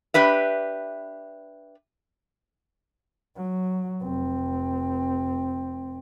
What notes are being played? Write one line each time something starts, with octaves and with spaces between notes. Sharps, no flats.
D4 G4 B4 E5
F#3
F1 C4